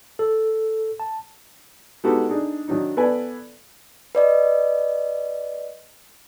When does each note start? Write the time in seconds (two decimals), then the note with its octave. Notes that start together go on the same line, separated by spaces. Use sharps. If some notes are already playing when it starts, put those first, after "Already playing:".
0.19 A4
1.00 A5
2.04 G#3 B3 D#4 F#4 G4 A4
2.29 D4 D#4 G#4
2.68 D#3 F#3 D4 D#4
2.97 B3 A4 B4 D5 G#5
4.15 B4 D5 D#5